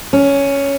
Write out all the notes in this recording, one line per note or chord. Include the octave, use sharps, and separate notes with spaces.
C#4